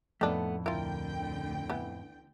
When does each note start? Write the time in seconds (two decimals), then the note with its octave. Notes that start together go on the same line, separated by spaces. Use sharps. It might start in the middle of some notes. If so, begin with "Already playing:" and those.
0.21 F2 A2 D#3 A3 B3 D4 A4
0.66 D2 D3 E4 F4 A#4 G5
1.70 E3 B3